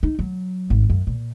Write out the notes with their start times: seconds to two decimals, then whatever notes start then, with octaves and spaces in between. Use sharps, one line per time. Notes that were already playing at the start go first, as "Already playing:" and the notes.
0.03 D#4
0.19 F#3
0.70 G#1
0.90 F#2
1.07 A#2